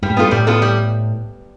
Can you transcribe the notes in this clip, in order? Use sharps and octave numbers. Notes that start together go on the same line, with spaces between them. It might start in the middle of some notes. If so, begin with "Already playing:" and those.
G2 G3
A2
G2 B3 F4 A4
A2 G3
B3 F4 A4
G3